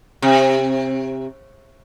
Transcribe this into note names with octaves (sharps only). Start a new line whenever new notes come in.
C3